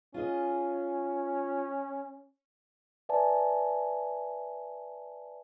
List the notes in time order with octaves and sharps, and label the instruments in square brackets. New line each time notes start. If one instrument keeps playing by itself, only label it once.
[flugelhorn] C#4 [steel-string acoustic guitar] F4 G#4 D#5
[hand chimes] B4 D5 E5 G#5 A5